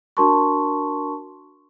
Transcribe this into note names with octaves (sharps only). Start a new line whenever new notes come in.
D4 F#4 A#4 A5 C6 C#6